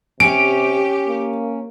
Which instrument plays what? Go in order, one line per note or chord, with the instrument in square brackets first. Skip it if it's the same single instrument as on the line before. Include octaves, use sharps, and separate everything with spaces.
[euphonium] C3 [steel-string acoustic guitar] C#4 [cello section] G4 [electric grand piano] D7
[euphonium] A#3